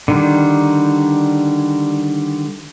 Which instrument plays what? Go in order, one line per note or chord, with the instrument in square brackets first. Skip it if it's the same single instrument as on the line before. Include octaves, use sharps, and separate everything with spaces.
[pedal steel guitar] D3 D#3 G3